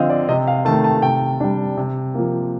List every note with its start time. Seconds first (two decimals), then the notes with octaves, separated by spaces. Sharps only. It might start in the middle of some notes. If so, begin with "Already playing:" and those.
Already playing: D3 F3 C4 D#5 F5
0.10 D5
0.29 C3 D#5
0.47 F5
0.65 D#3 A3 A5
0.84 A5
1.02 C3 G5
1.40 G3 D4
1.77 C3
2.14 F3 A#3